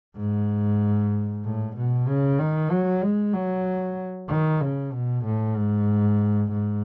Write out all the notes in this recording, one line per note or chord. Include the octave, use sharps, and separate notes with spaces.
G#2
A2
B2
C#3
D#3
F#3
G#3
F#3
D#3
C#3
B2
A2
G#2
G#2